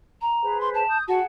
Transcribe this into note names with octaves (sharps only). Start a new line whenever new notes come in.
A#5
G#4 B4 C5
C6
A5
D#6 G6
F#4 G#4 F#5 A5